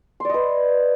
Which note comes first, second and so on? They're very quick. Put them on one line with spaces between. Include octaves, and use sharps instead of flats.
C6 D5 D#5 B4